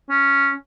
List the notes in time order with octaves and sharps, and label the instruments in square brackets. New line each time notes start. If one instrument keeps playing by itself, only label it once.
[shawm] C#4